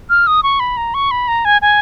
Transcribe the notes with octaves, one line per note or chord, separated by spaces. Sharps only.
F6
D#6
C#6
B5
A#5
C#6
B5
A#5
G#5
G#5